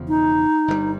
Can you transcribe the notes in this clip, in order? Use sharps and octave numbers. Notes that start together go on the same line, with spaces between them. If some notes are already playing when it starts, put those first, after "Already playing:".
Already playing: E1 E2 C#3 F3
D#4
G1 G2 D3 G3